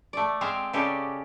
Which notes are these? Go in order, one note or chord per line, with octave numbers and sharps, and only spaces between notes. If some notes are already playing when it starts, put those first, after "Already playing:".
A3 D5
G#3 C4 C5 E5 F5 G5
C#3 G#3 C#4 G4 A4 D5